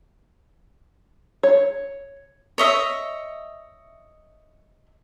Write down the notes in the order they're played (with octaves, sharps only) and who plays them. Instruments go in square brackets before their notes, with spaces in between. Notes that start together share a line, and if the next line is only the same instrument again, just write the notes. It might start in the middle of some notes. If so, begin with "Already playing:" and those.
[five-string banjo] C#5
[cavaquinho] C#5 D#5 E5